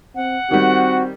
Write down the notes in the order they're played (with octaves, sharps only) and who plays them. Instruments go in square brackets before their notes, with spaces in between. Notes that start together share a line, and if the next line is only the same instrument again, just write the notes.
[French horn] C4 [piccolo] F#5
[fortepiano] D#3 G3 [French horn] C4 [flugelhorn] F#4